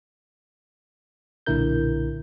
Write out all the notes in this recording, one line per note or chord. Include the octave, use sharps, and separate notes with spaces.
B1 A#2 D3 E4 A#4 G6